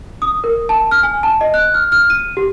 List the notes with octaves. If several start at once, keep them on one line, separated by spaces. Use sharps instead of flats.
D#6
A#4
A5
F6
G#5
A5
D#5
F#6
F6
F6
D#7
G4